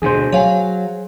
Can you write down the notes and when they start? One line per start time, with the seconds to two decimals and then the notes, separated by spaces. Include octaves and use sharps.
0.02 D2 B2 G#4 C5
0.32 F#3 C#5 F5 G#5